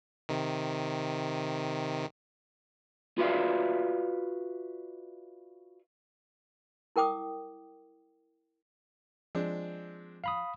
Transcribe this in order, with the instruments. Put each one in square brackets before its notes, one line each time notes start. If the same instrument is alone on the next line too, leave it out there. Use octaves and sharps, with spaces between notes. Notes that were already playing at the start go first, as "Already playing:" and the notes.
[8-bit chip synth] C3 D#3
[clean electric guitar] F4 F#4 B4 D5 E5 F5
[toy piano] E4 A#4 G5 D6 D#6
[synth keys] F3 [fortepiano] G#3 C4 D4
[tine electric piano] F5 B5 D#6